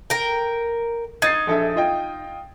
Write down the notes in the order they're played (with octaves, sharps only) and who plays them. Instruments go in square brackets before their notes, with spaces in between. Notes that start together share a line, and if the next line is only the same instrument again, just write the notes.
[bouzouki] A#4 G5
[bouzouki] D#4 [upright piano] G#6 A6 C7
[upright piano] A#1 A4 E5
F4 D#5 G5